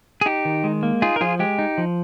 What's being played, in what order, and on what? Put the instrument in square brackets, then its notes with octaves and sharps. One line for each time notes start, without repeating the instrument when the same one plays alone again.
[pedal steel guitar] G#4
D#4 G4
D#3
G#3
A#3
D#4 F4 G#4
A#4
F3 F4 G#4
G#3 G4
D#4
F3